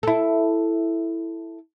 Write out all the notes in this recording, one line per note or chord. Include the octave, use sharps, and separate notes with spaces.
E4 A4